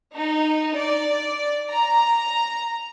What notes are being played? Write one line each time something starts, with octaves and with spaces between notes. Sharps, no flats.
D#4
D5
A#5